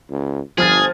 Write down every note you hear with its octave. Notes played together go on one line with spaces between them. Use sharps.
C#2
G1 F3 G#4 F6 A6